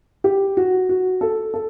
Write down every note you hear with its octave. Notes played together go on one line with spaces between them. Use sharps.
G4
F#4
F#4
A4
A4